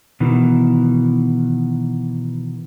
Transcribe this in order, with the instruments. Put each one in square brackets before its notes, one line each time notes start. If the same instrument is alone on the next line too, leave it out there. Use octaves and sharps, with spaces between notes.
[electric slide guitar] B2 D#3 E3